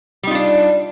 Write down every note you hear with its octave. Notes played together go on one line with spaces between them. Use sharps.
G3 D4 D#4 F4